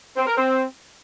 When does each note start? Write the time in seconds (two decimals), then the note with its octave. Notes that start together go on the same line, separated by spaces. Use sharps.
0.17 C4
0.26 A#4
0.36 C4